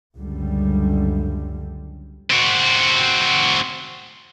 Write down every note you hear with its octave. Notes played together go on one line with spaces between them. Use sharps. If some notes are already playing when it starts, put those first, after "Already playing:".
C#2 F#2 D3 G3
C4 F#4